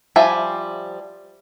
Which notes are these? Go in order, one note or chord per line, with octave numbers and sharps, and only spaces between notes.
F3 G3 E5 G#5